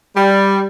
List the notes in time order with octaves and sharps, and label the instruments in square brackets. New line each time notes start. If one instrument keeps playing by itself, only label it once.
[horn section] G3